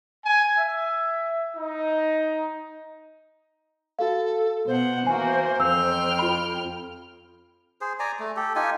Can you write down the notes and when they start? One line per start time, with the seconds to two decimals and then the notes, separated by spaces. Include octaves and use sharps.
0.25 G#5
0.58 E5
1.57 D#4
3.99 F#4 A4 F5
4.67 B2 C5 F#5
5.07 E3 A#3 F#4 G#5
5.60 F2 G5 E6 F6
6.19 F4 B5
7.81 G#4 C5
7.99 D5 G#5 A#5
8.19 A3
8.36 G4 A4
8.56 D#4 F4 G4 G#5